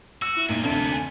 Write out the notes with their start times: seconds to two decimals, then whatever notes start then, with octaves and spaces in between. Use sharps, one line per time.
0.22 F#4 E6
0.36 E4
0.49 G2 A#2 D#4
0.63 F1 D2 A#3 B3 D4
0.92 G#5